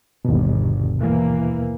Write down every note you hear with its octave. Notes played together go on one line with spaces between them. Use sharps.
G1 D#2 B2
E3 A#3